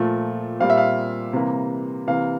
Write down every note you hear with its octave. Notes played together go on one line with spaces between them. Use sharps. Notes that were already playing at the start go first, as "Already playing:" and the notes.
Already playing: A#2 F3 A3
A#2 G3 C4 F5
E5
F5
C3 E3 G3 A#3
C3 E3 A#3 F5